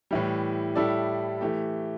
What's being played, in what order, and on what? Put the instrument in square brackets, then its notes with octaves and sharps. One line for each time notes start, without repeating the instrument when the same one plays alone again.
[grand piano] A2 E3 G3
A2 G3 E4 A4 D5
E3 A3 G4